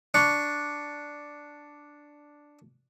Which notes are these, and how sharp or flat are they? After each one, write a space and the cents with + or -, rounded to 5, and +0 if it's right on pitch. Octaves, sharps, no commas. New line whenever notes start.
D4 +0 C#6 +0